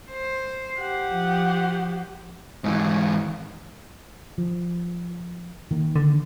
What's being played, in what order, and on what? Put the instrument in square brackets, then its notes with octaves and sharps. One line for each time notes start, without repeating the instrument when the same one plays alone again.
[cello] C5
[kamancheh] G4 F#5
[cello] F3
[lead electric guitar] G#2 E3
[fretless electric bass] F3
D#3 A#3
[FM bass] D3